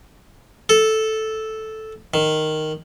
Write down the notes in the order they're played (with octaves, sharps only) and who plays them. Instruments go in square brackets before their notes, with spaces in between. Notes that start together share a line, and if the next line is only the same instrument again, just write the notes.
[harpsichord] A4
D#3